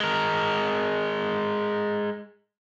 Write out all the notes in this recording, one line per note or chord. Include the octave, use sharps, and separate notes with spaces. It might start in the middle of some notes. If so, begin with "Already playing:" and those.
G#3 A#4